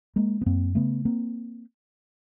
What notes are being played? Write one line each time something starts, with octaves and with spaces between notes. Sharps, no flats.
G#3 A#3
B3
F#2 A#3 C4
C#3 A3 B3
A#3 C4